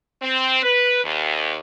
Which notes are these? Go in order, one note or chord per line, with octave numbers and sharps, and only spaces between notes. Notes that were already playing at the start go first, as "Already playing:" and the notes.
C4
B4
D#2